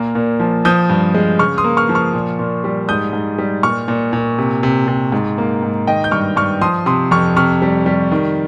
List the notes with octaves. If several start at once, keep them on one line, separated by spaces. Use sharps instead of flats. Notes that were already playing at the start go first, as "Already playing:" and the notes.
Already playing: A#2 A#3
A#2
F3
F3 D#6 G6
G2
G#3
C#3 C#6 F6
C6 D#6
A#3
C#6 F6
F3
C#6 F6
A#2
A#2
G3
G#2 D#6 G6
G#2
G3
A#2 C#6 F6
A#2
A#2
C3
C3
C3
G#2
A#3
G#2
D#3 D#5 G5
G6
G2 C#6 F6
G2 C#6 F6
F3 C6 D#6
C3 C6 D#6
F2 C#6 F6
C3 C#6 F6
G3
G3
D#3